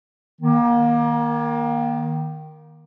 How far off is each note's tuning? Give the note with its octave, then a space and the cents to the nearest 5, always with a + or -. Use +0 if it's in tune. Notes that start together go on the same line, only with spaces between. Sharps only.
D#3 +0 A#3 +30